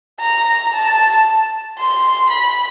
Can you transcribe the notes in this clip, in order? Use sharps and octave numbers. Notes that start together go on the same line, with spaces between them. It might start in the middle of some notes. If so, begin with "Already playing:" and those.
A#5
A5
C6
B5